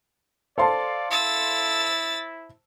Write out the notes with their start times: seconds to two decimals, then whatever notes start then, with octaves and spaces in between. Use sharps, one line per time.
0.58 A4 C5 D5 F5 A5 C6
1.11 E4 E6 A6